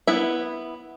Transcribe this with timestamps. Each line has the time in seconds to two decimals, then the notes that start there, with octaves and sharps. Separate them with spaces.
0.07 B3 E4 E5